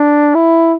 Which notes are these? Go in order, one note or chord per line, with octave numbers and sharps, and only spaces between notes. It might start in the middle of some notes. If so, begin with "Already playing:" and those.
Already playing: D4
E4